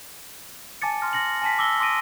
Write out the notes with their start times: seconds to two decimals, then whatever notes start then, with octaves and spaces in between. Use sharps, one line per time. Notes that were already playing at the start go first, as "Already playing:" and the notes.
0.82 G#5 A5 D6 A6 C#7
1.01 C6 F6 A#6
1.13 C6 A#6 C#7 F#7
1.42 G#5 A5 B6
1.59 D6 E6 A#6 G7
1.80 C6 D6 D#6 A#6 D7 D#7